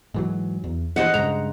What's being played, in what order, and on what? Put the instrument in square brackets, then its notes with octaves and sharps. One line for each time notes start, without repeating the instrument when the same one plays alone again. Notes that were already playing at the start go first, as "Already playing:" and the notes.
[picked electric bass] G#2 E3 F#3
E2
[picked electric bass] G2 E3 [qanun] C5 D#5 F#5
[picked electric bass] G2 C#3 G#3 [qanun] A#5